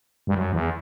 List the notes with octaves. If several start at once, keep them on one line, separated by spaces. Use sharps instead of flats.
G2
F#2
E2